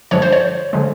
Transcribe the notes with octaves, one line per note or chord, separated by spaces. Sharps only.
G2 D3 F3 G#3 C#5
C5
C#5
D3 F3 G#3